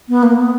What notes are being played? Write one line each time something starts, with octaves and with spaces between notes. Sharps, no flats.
B3
A#3
B3